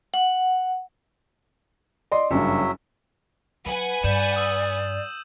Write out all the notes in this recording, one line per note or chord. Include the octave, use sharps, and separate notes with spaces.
F#5
D5 D#5 C6
F#1 G2 F#3 E5
F#3 F4 B4 F#5 G#5
G2 D5 G6 D#7 E7
D#6 E6 F#7